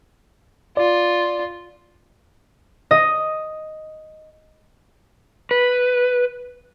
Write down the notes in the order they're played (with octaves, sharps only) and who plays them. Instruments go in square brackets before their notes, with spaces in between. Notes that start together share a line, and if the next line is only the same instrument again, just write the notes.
[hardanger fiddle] F4 [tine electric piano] D5
[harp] D#5
[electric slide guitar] B4